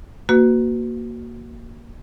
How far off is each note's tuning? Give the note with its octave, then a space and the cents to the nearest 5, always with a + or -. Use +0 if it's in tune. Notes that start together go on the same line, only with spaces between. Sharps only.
A#3 +0 F#4 +0 B4 +20